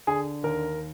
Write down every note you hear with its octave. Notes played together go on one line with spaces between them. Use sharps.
D3 G#4
D#2 A#4